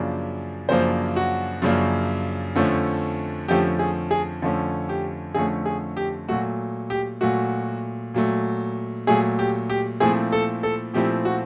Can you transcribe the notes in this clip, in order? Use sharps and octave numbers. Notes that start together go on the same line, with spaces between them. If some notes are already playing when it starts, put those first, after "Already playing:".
Already playing: F#2 C#3 F3 A#3 D4
F#2 C#3 F3 A#3 D4 C5
F#4
F#2 C#3 F3 A#3 D4
F2 D3 F3 A3 C#4
F2 D3 F3 A3 C#4 G4
G#4
G#4
F2 D3 F3 A3 C#4
G4
F2 D3 F3 A3 C#4 G#4
G#4
G4
A#2 F#3 A3 F#4
G4
A#2 F#3 A3 F#4
A#2 F#3 A3
A#2 F#3 A3 G#4
G4
G4
A#2 F3 A3 C4 E4 G#4
A4
A4
A#2 F3 A3 C4 E4 G4
F#4